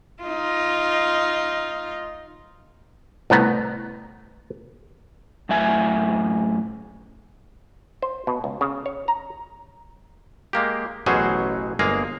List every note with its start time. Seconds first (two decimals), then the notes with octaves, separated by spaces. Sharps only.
0.23 D#4 F4
3.30 C2 A2 B3 A#5
5.49 F#2 A2 E5 G#5
8.02 C5
8.27 B2
8.44 C#2
8.61 C#3
8.86 C#5
9.08 A#5
10.53 G#3 A#3 G4
11.06 A1 B2 F#3 C#4 G#4 C5
11.79 G1 G#3 A#3 G#4 F5 A#5